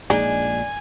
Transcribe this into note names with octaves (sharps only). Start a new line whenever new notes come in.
A#1 A#2 G#3 D4 D#4 G#4 G#5